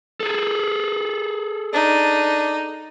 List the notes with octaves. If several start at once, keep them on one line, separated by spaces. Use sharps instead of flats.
G#4 A4
D4 D#4